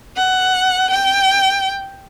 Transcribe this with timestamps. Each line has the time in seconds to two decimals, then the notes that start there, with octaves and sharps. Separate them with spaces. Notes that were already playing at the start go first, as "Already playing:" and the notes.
0.17 F#5
0.90 G5